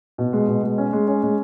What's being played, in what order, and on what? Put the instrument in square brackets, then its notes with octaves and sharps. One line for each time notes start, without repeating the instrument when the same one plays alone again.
[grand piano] B2
G#3
B2
G#3
C#4
G#3
C#4
G#3